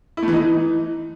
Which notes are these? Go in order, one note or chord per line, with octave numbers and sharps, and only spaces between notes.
E4
A3
E3
D#4
E3